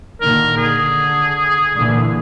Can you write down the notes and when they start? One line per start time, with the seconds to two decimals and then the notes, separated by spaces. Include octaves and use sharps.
0.21 A#2 D3 D#3 A#4
0.57 D3 G#4
1.74 A#2 D3 E3